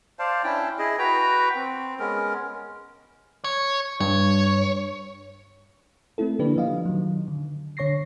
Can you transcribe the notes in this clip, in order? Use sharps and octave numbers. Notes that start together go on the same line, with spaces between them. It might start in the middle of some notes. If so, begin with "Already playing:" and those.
C5 D5 F5 A5
C#4 D4 E4 G5
E4 G#4 D#5
F#4 B4 G5 A#5
C4
G#3 B3 C#4 A#4
C#5
G2 C#5
A3 C4 E4 A4
D3 F3 A#3 D4 G4 B4
F3 D#5 F5
D#3 F#3
D3
D3 C#5 C#6 A#6 C7